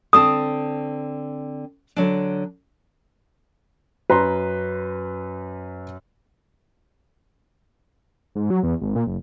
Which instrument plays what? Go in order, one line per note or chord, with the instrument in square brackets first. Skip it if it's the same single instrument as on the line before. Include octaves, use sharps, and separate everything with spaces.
[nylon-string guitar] D3 C4 A5 [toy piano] D#6
[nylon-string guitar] D3 F#3 D4
[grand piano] F#2 [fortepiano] B4 A#5 C6
[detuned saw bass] G#2
F#3
E2
G#1
A#2
F#1